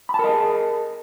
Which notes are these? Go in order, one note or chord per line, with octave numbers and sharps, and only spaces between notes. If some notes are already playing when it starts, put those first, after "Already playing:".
G#4 A#4 D#5 A5 B5